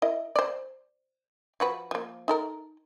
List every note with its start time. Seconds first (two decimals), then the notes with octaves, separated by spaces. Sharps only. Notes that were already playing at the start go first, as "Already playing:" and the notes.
0.02 E4 A#4 D#5
0.35 C5 D5
1.60 F3 F#4 B4
1.91 F3 A#3
2.28 D#4 A4 A#4